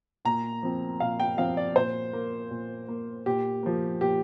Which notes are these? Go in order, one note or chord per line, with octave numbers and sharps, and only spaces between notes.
A#2 A#5
F3 C4
A#2 F5
G5
F3 C4 F5
D5
A#2 C5
A#3
A#2
A#3
A#2 G4
F3 A#3
A#2 G4